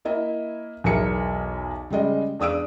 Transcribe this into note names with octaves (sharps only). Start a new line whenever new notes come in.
A#3 E4 D#5 E5
B1 E2 A#4 E5 C#7
C#3 G3 G#3 D#5
E2 D4 D#6 E6 D7